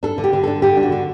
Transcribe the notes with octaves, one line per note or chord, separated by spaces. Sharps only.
D4 A4
D3
G4
D3
D4 A4
D3 G4
D4
F#4
D3